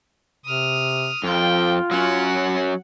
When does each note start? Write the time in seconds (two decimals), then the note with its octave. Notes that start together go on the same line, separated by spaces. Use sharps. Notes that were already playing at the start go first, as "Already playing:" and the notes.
0.45 C3 D#6 F6
1.23 F2 F4 G5
1.91 F#3 C#4 F#5